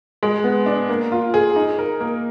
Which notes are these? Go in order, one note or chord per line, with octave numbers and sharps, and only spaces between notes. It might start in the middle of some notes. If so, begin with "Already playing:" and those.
G#3
B3
D4
A#3
F4
G#4
D#4
A#4
A#3